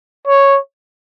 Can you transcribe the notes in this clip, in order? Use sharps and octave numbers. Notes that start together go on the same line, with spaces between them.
C#5